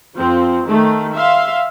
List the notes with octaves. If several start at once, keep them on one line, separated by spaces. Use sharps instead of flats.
F2 F3 C4
D#3 A3
E5 F5 C6